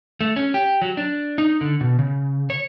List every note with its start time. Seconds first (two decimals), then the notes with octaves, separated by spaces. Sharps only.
0.21 A3
0.36 C#4
0.54 G4
0.82 F#3
0.97 D4
1.38 D#4
1.61 D3
1.81 B2
1.99 C#3
2.50 C#5